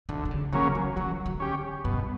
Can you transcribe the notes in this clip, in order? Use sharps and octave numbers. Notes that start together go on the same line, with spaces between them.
D2 D3
D3
C#3
C#3 E3 F#3 A#3 C#4
E3
E3 F#3
D3
C#4 G4
G2 B2